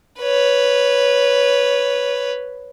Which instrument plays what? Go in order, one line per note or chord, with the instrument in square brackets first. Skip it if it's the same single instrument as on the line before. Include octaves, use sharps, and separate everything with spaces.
[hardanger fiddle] B4 C#5